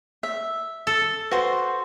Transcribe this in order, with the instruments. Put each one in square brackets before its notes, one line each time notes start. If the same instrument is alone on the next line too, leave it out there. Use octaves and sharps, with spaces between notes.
[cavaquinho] E5
[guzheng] A4
[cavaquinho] F#4 C5 [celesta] B4